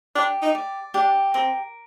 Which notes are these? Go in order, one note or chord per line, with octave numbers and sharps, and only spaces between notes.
D4 G4
D#4
D5
D4 G4
C4 A#4